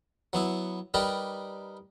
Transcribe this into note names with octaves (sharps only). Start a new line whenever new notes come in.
F#3 B3 E4
G3 D#4 G4 A#4 B4 D5